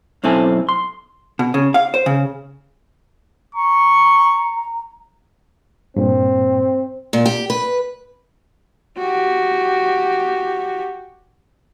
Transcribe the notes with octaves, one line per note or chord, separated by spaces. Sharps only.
B1 F#2 C4 E4 A4 G#5
C6
B2
C#3
F5
C5
C#3
A#5 C#6
G2 A#2 C4
A#2
G4
B4
F#4 G4